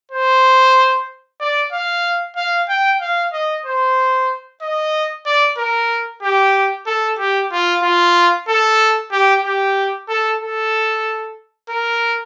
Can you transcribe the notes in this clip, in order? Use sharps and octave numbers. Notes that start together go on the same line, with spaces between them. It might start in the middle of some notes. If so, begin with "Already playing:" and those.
C5
D5
F5
F5
G5
F5
D#5
C5
D#5
D5
A#4
G4
A4
G4
F4
F4
A4
G4
G4
A4
A4
A#4